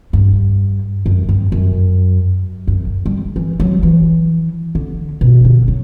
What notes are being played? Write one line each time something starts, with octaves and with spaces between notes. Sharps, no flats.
G2
F#2
G2
F#2
F#2
G3
E3
F#3
E3
D3
B2
D3
F#3